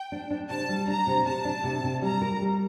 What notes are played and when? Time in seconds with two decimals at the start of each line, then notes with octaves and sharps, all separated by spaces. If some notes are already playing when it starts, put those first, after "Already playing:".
Already playing: G5
0.12 D4
0.31 D4
0.50 C3 A5
0.69 G3
0.88 D4 A#5
1.07 C3
1.26 C3 A5
1.45 D4
1.64 C3
1.84 C3
2.02 G3 A#5
2.22 A#4
2.41 G3